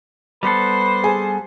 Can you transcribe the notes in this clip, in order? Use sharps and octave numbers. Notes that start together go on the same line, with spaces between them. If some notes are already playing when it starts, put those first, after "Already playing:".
G3 B3 A4 B4 C5
G#4 G#5